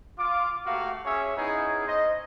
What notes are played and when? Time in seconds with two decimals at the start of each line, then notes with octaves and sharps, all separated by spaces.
0.18 F4 D6
0.66 A3 A#3 F#4 G4 F5
1.06 C#4 G#4 C#5 E5
1.37 B3 C#4 D#4 E4 G#4
1.86 C5 D#5